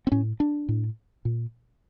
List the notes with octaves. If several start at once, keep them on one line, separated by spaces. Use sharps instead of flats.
C4
A2 C#4
D4
A2
A#2